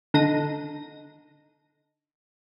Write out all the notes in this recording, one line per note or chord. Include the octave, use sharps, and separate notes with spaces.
D3 D#4 A#6 D#7